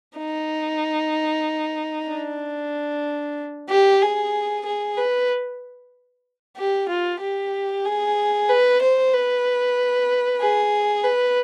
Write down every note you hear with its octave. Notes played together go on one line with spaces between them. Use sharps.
D#4
D4
G4
G#4
G#4
B4
G4
F4
G4
G#4
B4
C5
B4
G#4
B4